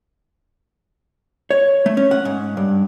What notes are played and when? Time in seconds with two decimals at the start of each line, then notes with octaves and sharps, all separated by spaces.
1.51 C#5
1.86 A3
1.97 C#4
2.11 F#5
2.25 G#2
2.57 G2